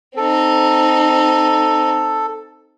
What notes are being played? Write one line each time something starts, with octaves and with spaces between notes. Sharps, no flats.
C4 D#4 A4